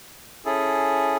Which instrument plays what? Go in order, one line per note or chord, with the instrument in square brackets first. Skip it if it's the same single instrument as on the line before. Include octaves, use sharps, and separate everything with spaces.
[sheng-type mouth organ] C#4 E4 G#4 A4